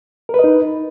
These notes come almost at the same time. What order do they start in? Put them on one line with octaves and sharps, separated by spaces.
A#4 B4 D#5 D#4